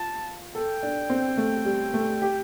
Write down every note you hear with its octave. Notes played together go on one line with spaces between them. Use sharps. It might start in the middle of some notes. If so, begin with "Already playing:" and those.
Already playing: F4 A5
A4 G5
D4
C4
A3
G3
A3
G4